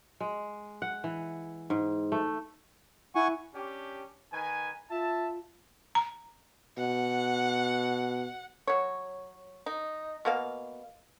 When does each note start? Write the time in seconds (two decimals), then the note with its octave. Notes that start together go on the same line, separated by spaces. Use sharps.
0.20 G#3
0.82 F#5
1.04 E3
1.70 G#2
2.12 A3
3.15 E4 F#5 G#5 C#6
3.55 C#4 D4 G4
4.33 D#3 B4 G#5
4.91 F4 E5 A5
5.95 A#5
6.78 B2 F#5
8.67 F#3 C#5
9.66 D#4
10.25 B2 A#3 F5